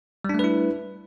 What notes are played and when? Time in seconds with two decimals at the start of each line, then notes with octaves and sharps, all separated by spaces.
0.24 G3
0.29 D4
0.34 A3
0.39 B4
0.44 E4